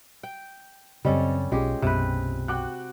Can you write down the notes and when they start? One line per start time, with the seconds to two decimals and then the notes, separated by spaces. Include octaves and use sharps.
0.23 G5
1.05 F#2 C#3 G3 C4 C#4 A4 D#5
1.52 B1 G#3 C#4 F4 G4 G#4
1.82 B1 F#2 C3 B3 B4
2.48 F#4 G5 D6 F#6